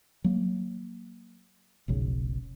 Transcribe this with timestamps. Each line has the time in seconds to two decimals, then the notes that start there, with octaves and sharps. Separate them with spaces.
0.24 F#3 A#3
1.88 F1 B1 C#3